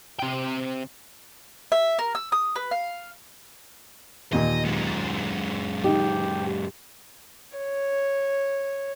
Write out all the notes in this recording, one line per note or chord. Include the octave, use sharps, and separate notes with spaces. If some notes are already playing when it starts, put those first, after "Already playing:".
C3 G5
E5
A#4
E6
D#6
B4
F5
D#2 A#2 D#5
F#2 G#3
D#3 D#4 G4
C#5